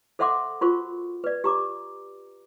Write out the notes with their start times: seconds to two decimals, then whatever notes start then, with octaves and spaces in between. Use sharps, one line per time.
0.19 A4 C5 E5 F#5 C6 D6
0.61 F4 F#4 A#4 C5 C#6
1.24 B4 D5
1.44 G4 A#5 D6